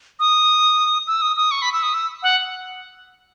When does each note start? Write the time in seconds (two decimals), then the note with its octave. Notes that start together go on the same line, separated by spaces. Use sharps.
0.20 D#6
1.07 E6
1.22 D#6
1.37 D#6
1.51 C#6
1.62 B5
1.73 E6
1.83 D#6
1.94 E6
2.23 F#5